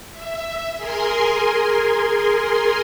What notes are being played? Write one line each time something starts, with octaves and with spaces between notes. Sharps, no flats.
E5
G#4 A#4 G#5 C6